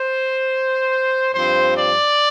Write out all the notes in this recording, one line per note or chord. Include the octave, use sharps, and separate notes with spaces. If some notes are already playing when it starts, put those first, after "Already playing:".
Already playing: C5
G2 F3 C4 C5
D5